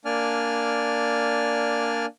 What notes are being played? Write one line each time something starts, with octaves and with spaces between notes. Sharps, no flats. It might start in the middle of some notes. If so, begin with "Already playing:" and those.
A#3 D4 D5 G#5 F6